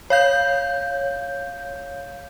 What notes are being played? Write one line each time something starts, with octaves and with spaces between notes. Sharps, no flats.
C#5 F5 G6